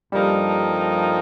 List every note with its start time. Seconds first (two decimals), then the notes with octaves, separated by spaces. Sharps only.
0.12 G2 F3 G3 A#3 D#4 A4